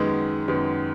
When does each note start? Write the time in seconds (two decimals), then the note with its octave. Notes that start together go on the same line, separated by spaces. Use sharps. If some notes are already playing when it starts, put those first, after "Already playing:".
Already playing: F#2 D#3 G#3 B3
0.48 F#2 D#3 G#3 B3